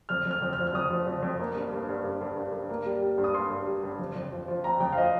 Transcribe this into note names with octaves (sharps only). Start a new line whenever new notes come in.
F2 F6
F2
F6
F2
F6
F3
F6
F2 D#6
F3
F2
F2
A#3
G2
G2
G2
G2
G2
G2
G2
A#3
G3
G3
G2
D#6
G2 C6
G2
G3
G2
F2
F2
F3
F3
C4 A#5
F2 G5
F5
F3 D#5